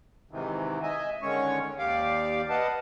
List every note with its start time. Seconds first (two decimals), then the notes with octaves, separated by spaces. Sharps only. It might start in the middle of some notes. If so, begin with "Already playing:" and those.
0.31 G#2 C3 D#3 E3
0.83 D#5 E5 G#5
1.22 D3 D#3 G#3 C#4 C#5 C#6
1.79 D#2 G4 D5 F5 D6
2.49 B4 D#5 F5 F#5 A5